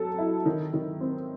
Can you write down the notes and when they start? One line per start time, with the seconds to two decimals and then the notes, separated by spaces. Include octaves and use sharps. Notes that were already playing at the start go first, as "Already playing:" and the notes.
Already playing: F#3 A4
0.18 E4
0.45 D#3
0.73 D#3
1.01 C4